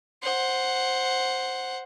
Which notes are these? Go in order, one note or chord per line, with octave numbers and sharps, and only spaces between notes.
C5 F#5